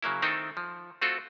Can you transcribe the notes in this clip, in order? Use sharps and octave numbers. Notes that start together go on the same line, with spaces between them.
C#3 F#3 A#3 E4
D#3 A3 C4 D#4 E4 A4
F3
A3 C4 F4 F#4 A4